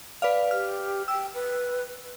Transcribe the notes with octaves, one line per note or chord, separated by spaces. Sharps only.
B4 D5 F5
G4 F6
G5 E6
B4